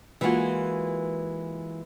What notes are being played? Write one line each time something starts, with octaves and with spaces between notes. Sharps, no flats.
E3 G#3 A#3 B3 F4 F#4